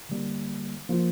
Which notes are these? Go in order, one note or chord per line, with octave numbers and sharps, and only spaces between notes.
D3 G3 A#3
F3 A#3 F4